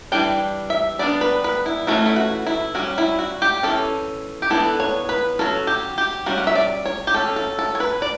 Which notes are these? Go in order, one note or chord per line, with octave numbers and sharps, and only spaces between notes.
E3 G3 D4 G5
E5
G3 B3 D4 D5
B4
B4
E4
E3 A3 C#4 F#4
E4
F#4
E4
G3 C#4 F#4
E4
F#4
G4
E3 A3 C#4 A4
G4
E3 B3 D4 A4
C#5
B4
F#3 C#4 A4
G4
G4
G3 C#4 F#4
F#5
E5
D5
C#5
G4
F#3 C#4 A4
A4
A4
C#5
B4
D5